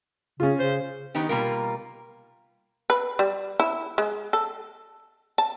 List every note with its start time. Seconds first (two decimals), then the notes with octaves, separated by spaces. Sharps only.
0.40 C#3 C#4 F4
0.59 C#3 C5
1.15 D#3 B3 D#4 G4
1.29 B2 G3 A#3 F4 G4 A#4
2.90 B4
3.19 G3
3.60 E4
3.98 G#3
4.33 A4
5.38 A5